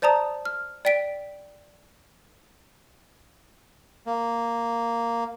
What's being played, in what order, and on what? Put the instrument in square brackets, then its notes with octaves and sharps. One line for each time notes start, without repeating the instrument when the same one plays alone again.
[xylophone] C5 D5 A5 A#5 D#6
F6
D5 G5 B6 D7
[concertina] A#3